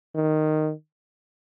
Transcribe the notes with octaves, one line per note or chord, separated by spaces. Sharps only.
D#3